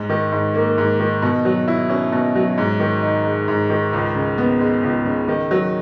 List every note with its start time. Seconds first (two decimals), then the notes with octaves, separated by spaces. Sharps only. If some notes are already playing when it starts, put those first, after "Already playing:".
Already playing: G#2
0.09 D#3
0.32 G#2
0.55 A#3
0.78 G#2
1.00 D#3
1.22 B2
1.45 F#3
1.68 E4
1.90 C#4
2.12 B2
2.36 F#3
2.58 G#2
2.80 D#3
3.02 D#4
3.25 G#3
3.48 G#2
3.70 D#3
3.93 C#2
4.15 C#3
4.38 B3
4.61 G#3
4.83 C#2
5.05 C#3
5.28 D#3
5.51 F#3